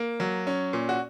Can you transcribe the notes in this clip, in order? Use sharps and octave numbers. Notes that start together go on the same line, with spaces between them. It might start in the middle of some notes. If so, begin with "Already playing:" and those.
Already playing: A#3
F#3
C#4
A#2
F#4